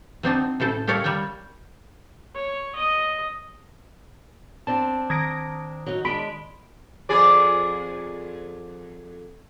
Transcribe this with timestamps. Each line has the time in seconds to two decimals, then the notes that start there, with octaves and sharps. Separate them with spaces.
0.23 F#3 C4 D4 D#4
0.60 A2 C#3 A4 C5
0.87 G4 A4 A#4 C#5 D5 F5
1.04 G3 A#4 C#5 G5
2.35 C#5
2.75 D#5
4.67 C4 D4 A5
5.10 D#3 G#6 A#6 D7
5.86 F#3 D#4
6.05 G#3 D4 B5 B6 D7
7.09 F2 G#4 D5